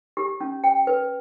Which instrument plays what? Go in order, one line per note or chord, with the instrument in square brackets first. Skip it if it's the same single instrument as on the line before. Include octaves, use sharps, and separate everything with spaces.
[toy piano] G4
C#4
G5
B4